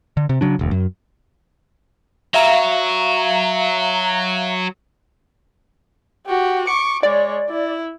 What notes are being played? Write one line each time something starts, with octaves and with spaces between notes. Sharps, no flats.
D3
C3
C#3 F#3 D4
E1 D2
F#2
F#3 E5 F5 A#5
F#4 G4
C#6 D6 C#7
G#3 C#5 D5
E4